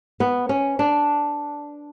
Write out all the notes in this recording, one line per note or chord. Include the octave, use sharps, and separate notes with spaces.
B3
C#4
D4